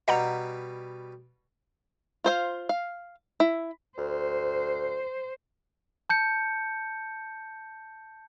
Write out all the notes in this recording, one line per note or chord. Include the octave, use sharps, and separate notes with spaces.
B2 G3 B4 D#5 F#5 A#5
F4 C5 F5
F5
E4
D2 C5
A5 G6 C#7